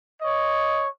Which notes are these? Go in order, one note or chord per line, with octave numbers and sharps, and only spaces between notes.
C#5 D#5